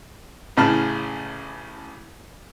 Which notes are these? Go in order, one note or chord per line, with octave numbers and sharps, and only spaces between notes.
A1 A2 C#3 A5 F6